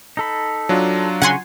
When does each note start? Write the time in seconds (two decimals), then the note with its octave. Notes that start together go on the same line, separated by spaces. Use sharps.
0.17 D#4 A4 B5
0.69 F#3 D4 F4
1.22 C#3 C#5 F#5 G#5 C6